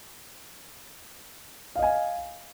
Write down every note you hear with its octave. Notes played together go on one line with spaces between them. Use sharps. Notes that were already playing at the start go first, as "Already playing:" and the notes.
D#5 F5 G#5